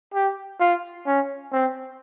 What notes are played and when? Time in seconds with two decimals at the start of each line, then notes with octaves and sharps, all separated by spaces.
0.14 G4
0.60 F4
1.06 C#4
1.52 C4